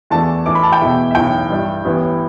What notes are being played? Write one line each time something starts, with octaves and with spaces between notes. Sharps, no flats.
E2 E3 A3 D4 A5
A2 E3 A3 D6
B5
A5
G5
E2 B2 A3 E4
E5
B1 A2 E3 G5
G2 G3 E4
A1 A2 E3 B3 E4